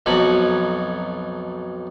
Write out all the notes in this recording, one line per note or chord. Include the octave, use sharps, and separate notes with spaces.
B1 F2 F#3 D#4 C#5 B5